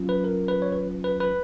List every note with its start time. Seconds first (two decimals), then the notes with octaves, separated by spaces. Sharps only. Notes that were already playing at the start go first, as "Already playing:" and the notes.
Already playing: F#3 C#4 F4
0.09 B4
0.24 A#4
0.48 B4
0.62 C#5
0.72 B4
1.04 B4
1.20 B4